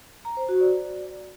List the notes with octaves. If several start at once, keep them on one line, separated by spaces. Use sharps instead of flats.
A#5
C5
F#4
D5